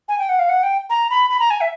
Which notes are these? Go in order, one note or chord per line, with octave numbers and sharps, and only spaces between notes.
G#5
G5
F#5
F5
F#5
G5
A#5
B5
B5
A#5
G#5
E5